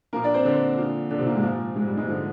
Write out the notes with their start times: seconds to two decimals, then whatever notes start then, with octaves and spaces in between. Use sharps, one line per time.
0.13 A#2 F3 A#3 A#4
0.24 D4 D5
0.34 C4 C5
0.45 D3 D4
0.78 A#2 F3
1.10 D3 D4
1.19 C3 C4
1.27 A#2 A#3
1.35 G#2 G#3
1.43 A#2 F3 A#3
1.76 G#2 G#3
1.86 G3
1.97 G#2 G#3
2.08 D3 F3